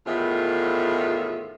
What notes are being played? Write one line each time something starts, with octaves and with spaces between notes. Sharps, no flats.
E2 A2 D#3 F4 E5